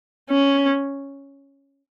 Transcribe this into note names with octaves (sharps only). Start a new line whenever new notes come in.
C#4